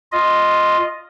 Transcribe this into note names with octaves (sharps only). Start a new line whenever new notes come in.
F4 D#5